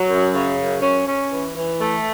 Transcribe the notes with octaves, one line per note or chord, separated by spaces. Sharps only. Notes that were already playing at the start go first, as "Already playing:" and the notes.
Already playing: F#3
F#2
C#3
F#2
C#4
C#4
E3
E3
A3